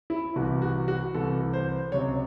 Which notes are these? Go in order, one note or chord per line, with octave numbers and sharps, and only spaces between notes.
E4
C2 C3 E3 F#4
F#4
F#4
C2 C3 E3 A4
C5
C#2 C3 F#3 C#5